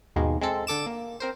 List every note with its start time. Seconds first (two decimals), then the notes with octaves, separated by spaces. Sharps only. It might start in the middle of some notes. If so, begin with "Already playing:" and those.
0.16 D#2 G#2 B2 D#3 G#3 A#3
0.41 G#3 C4 A4
0.67 D3 A4 D6 E7
0.86 A#3
1.20 C4 A#4 C5